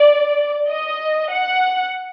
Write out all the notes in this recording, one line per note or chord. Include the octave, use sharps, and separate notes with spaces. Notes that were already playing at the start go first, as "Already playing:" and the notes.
Already playing: D5
D#5
F#5